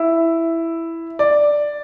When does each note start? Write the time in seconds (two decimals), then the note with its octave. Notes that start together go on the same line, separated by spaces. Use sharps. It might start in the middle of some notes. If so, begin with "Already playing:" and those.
Already playing: E4
1.19 D5